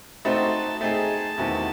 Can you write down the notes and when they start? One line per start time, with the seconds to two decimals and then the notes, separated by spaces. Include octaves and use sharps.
0.25 A3 C4 D#4 F#4 C5 A5
0.81 A3 C4 D#4 G#4 A5
1.38 E2 D#3 A3 C4 F#4